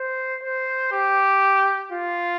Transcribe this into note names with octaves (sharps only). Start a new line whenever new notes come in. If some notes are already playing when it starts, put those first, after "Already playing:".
Already playing: C5
C5
G4
F4